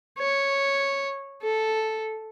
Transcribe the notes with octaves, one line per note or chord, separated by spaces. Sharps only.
C#5
A4